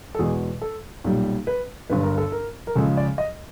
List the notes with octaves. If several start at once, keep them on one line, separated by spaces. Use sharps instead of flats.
A4
E2 B2 G#3 G#4
A4
B1 A#2 G3
B4
G1 G2 D3 B4
A#4
A4
A#4
A#4
C#2 C#3 F3 G#3 A4
D5
D#5